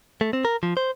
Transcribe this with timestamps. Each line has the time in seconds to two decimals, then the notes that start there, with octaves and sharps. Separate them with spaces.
0.21 A3
0.33 C4
0.45 A#4
0.63 F3
0.77 C5